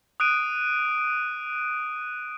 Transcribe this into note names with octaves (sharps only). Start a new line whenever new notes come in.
D#6 F#6 D7 D#7